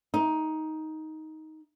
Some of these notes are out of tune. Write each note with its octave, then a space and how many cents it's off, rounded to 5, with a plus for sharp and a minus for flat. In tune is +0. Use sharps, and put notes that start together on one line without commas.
D#4 +10